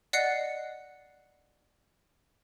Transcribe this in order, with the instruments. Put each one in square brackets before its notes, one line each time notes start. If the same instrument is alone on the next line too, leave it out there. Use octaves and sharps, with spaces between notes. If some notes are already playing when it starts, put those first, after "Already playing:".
[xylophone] D5 D#5 F#5 F#6 C7 C#7